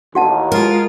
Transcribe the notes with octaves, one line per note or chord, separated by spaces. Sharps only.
A1 D#2 F#4 F#5 A5
G#3 F4 A#4